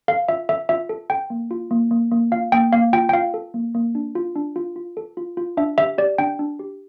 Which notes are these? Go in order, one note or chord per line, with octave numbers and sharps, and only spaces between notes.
A4 F5
F4 E5
A4 E5
F4 E5
A4
A4 G5
A#3
F4
A#3
A#3
A#3
F4 F5
A#3 G5
A#3 F5
F4 G5
G5
F4 F5
A4
A#3
A#3
D4
F4
D4
F4
F4
A4
F4
F4
D4 E5
G4 E5
G4 D5
D4 G5
D4
G4